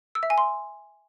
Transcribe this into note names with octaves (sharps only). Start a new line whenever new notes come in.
E6
E5
G#5
C6